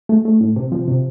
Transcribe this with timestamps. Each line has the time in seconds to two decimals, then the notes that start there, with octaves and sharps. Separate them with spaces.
0.09 A3
0.25 A3
0.40 A2
0.56 C3
0.72 F3
0.88 C3